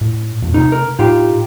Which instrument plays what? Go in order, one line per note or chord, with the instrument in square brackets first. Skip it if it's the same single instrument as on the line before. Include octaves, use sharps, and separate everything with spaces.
[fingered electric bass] A2
E2 A#2
[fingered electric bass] C3 A3 [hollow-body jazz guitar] D#4
[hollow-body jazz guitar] A#4
[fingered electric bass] A2 [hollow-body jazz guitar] D#4 F4 G4